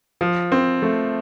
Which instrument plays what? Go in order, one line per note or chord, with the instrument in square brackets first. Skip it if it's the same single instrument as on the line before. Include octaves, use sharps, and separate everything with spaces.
[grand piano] F3
C4
A3